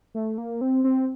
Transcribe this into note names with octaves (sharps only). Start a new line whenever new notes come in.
A3
A#3
C4
C4